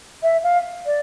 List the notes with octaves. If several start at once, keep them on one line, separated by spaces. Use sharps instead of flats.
E5
F5
D5